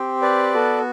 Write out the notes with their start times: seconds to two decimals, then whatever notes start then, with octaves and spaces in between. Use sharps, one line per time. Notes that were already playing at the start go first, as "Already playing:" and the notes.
Already playing: C4 G4
0.22 B4 D5
0.54 B3 F#4 A4